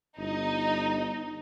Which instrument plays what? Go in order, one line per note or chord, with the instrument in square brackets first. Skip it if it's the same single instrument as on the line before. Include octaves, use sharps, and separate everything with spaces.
[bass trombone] G1 [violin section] D#4